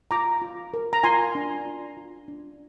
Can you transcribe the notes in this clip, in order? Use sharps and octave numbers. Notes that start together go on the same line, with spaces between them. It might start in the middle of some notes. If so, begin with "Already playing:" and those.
F4 A#5 D6
F4
A#4
A#5
F4 G#5 C6
D4
F4
F4
D4